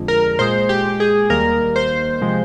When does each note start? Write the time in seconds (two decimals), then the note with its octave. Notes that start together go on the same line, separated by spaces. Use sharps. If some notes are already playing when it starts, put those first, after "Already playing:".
Already playing: F2 D3 G#3
0.08 A#4
0.39 A#2 G#3 C5
0.69 G4
1.00 G#4
1.30 D#2 D#3 G3 A#3 A#4
1.76 C5
2.21 C3 F3 G#3